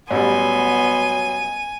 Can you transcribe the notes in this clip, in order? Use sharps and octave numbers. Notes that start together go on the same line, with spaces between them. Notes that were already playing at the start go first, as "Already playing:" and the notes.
A1 F#3 G3 B3 G#5 C6 D#7